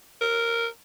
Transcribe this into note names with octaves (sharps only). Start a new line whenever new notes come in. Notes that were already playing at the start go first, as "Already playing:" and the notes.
A#4